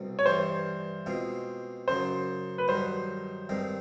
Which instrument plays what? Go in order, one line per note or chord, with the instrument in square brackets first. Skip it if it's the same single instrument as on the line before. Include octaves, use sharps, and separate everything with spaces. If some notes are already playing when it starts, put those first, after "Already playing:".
Already playing: [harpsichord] C2 B2 C4
[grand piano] C#5
[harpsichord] G2 E3 G3 [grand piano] C5
[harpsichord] B2 G#3 C4 F4
[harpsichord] F#2 C#3 F#3 [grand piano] C5
[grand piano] B4
[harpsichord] G2 D#3 F#3 [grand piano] C5
[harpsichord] G2 D#3 G#3 C4